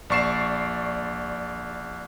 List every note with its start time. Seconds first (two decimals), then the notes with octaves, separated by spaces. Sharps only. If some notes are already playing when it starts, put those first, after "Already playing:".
0.10 A#1 D5 C#6 C7 E7